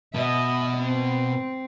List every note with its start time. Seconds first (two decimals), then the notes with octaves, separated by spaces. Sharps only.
0.15 B2 D#5 E5
0.78 C4